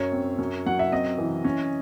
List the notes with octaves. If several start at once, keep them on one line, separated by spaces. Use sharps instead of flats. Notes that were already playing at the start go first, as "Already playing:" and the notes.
Already playing: F#2 C#5
C4
F#2
F#3 F#5
E5
C4 D#5
E3
C#4